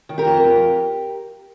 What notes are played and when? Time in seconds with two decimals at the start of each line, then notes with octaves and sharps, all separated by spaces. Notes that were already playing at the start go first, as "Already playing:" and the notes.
0.09 D#3
0.18 G4 A#4
0.27 F2
0.44 F2